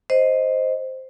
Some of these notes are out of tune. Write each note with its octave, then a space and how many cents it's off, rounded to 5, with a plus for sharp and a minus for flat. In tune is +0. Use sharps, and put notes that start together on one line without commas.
C5 +0 D#5 +0